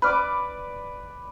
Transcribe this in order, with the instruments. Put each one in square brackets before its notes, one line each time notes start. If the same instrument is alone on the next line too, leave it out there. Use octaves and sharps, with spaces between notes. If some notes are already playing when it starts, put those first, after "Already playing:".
[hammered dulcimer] B4 D5 D6 [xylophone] B5 F6